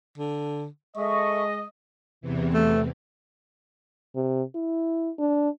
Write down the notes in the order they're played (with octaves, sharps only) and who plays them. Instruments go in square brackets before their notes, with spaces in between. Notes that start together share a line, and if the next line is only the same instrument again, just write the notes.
[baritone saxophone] D3
[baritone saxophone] G#3 [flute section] A4 E5 C#6 [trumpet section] D#5
[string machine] E2 C3 E3
[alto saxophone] A3
[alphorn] C3
E4
D4